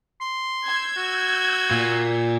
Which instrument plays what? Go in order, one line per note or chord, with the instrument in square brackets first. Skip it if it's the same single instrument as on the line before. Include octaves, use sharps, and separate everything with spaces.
[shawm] C6
[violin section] E6 G6 G#6
[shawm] F#4
[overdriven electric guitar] A#2